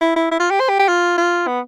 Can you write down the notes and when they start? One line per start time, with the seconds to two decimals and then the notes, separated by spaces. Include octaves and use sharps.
0.01 E4
0.16 E4
0.31 E4
0.40 F4
0.51 G4
0.60 C5
0.69 G4
0.79 G4
0.88 F4
1.18 F4
1.47 B3